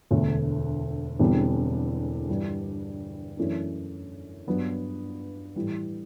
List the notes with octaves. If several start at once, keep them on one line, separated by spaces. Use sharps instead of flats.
E1 D2 D3 A3
E1 E2 D3 G3 C4
G2 E3 G3 D4
F#2 E3 A3 D4
G2 F#3 B3 D4
A2 E3 G3